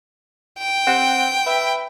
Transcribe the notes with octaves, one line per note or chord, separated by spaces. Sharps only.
G5
C4 F#5
B4 E5